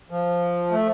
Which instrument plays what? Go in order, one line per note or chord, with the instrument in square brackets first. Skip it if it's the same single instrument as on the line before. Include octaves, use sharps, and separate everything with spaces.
[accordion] F3
A3